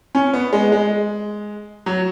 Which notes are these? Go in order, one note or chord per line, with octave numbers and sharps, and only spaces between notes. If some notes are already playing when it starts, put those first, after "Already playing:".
C#4
B3
G#3
G#3
F#3